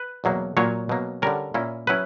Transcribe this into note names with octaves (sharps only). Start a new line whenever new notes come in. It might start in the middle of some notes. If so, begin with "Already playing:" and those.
Already playing: B4
E2 B2 F#3 A#3
A#2 F#3 A#3 C#5
B2 F#3 A#3
D3 G3 C#4 A#4
A#2 A#3 C#4 E4
F#3 C#4 E4 B4